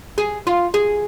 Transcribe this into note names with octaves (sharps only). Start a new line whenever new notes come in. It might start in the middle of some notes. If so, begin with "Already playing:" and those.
G#4
F4
G#4